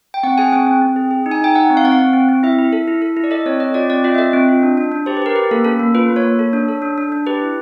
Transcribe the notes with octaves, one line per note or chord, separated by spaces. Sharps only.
G5
C4 F#5
G#4 G#5
C4 G5
C4
C4
G#4
G#4
D#4
G#5
D#4 G5
D#4 F#5
C4
F5
C4 F#5
F5
C4
C4
C4
E4 E5
E4
A4
E4
A4
E4
D5
A4 D#5
C4 C#5
C4 D#5
F4 D5
C4 D5
F4 D#5
E5
A4 D#5
C4
F4
D4
D4
D4
G4 C5
B4
G4 A#4
G4 B4
A#3 A4
C#4 A4
A#3
F4 B4
A#3
C#5
A#3
A4
D4
A4
D4
D4
D4
G4 B4
E4